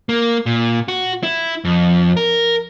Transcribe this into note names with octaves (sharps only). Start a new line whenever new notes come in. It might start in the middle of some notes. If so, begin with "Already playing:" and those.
A#3
A#2
F#4
E4
F2
A#4